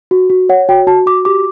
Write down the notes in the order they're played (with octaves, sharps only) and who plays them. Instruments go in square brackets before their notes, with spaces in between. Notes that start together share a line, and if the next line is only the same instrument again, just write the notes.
[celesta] F#4
F#4
C#5 F#5
F#4 G5
F#4 A5
F#4 D6
G4 D6